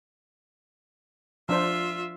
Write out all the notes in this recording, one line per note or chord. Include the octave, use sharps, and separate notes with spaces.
F3 D4 F4 C5 E5